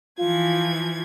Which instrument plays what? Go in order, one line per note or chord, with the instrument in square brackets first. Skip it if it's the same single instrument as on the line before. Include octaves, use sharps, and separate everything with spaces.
[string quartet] E3 F3 G#6 [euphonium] F4